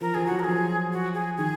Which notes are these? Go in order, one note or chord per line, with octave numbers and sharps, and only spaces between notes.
F3 A#4
F3 G#4
F#3 F#4
A#4
F3 G#4
F#4
G#4
D#3 G#4